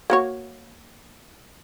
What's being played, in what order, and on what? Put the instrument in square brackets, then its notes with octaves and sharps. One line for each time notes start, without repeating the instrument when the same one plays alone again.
[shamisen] A#3 F#4 C#5